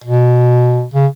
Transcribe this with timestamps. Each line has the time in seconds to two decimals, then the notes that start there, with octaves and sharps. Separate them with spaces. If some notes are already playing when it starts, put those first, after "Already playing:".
0.04 B2
0.94 C#3